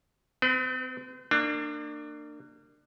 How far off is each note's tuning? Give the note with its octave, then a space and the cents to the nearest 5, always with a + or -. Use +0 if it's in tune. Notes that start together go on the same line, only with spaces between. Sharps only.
C4 -35 B4 +35
A#3 -30 D4 +25